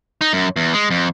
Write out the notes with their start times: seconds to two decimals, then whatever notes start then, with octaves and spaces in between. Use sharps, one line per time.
0.21 D#4
0.33 F#2
0.56 E2
0.74 G#3
0.91 F2